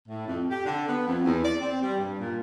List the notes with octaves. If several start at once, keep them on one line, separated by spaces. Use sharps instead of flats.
A2
F2
G4
D3
B3
F2
E2
D5
C4
G3
G2
A#2